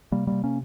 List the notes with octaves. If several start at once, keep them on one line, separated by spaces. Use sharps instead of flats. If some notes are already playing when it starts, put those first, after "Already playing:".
C3 G3 A#3
C3 G3 A#3
A#3 C#4